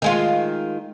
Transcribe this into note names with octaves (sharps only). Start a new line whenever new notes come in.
D#3 G#3 F4